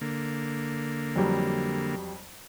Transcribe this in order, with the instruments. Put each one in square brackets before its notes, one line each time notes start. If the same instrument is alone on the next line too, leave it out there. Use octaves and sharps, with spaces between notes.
[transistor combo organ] D3 A#3
[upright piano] F2 F#3 G3